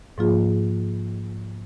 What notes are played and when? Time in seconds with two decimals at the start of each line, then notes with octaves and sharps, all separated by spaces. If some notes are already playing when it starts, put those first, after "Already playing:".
0.18 G#2 F3 A#3 F4 G#4